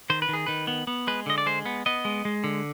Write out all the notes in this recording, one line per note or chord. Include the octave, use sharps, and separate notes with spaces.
D#3 C5
B4
D#3 G#4
D#3 B4
B3
B3
G#3 B4
D3 D#5
D5
G#3 C5
B3
B3 D#5
G#3
G#3
D3